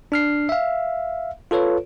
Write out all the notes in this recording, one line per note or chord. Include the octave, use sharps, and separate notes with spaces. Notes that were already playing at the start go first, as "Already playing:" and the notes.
D4 F6 C7
E5 F5
F4 A4 B4 C#5